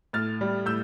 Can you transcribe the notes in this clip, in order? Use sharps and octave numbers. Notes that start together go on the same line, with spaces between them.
A2 F6 A6
G3
A2 E6 G6